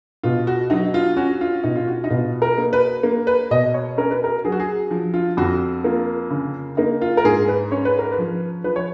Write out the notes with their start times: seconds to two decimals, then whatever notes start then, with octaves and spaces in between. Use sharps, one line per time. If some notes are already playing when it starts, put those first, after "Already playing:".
0.23 B2 F4
0.47 F#4
0.70 F#3 D#4
0.94 F4
1.17 C#4 F#4
1.41 F4
1.64 B2 D#4
1.76 F4
1.87 F#4
2.04 D#4
2.10 B2 F4
2.42 A#4
2.58 A#3
2.73 B4
3.03 A#3
3.27 B4
3.51 B2 D#5
3.74 C#5
3.97 C#4 A#4
4.11 B4
4.24 A#4
4.45 F#3 G#4
4.52 F#4
4.60 G#4
4.91 F3
5.14 F4
5.37 F2 F#4
5.84 A#3 F4
6.31 C#3
6.77 A#3 D#4
7.01 F4
7.17 A#4
7.25 G#2 G#4
7.48 B4
7.71 C#4 C#5
7.85 B4
7.99 A#4
8.11 B4
8.18 F3
8.64 F3 B4
8.76 C#5